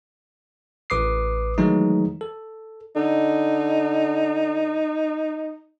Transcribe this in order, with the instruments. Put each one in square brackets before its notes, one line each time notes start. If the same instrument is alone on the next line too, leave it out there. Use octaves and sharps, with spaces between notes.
[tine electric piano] A1 B4 D6 D#6 C7
D#3 E3 F#3 G#3 A3 D#4
A4
[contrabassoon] D3 [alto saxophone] D#4